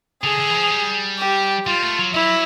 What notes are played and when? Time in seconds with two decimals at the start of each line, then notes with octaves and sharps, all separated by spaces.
0.23 D3 G#4
0.40 D3
0.50 E3
0.55 F3
0.70 G3
1.19 G4
1.66 G3 F4
1.82 A3
1.99 F#3
2.14 F#3 E4